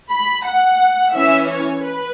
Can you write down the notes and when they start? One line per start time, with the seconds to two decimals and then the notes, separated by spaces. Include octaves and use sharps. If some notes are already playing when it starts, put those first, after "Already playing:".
0.09 B5
0.44 F#5
1.14 E3 C#4 E5
1.49 C#5
1.83 B4